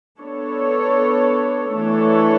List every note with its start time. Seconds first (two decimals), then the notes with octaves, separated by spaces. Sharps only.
0.19 B3 D4 A4 C#5
1.75 E3 A3 D4 A4 C#5